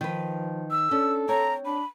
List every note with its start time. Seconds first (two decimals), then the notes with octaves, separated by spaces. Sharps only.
0.01 D#3 F3 B4
0.71 E6
0.91 C#4 D4 A4
1.29 C4 C#5 A#5
1.65 D4 B5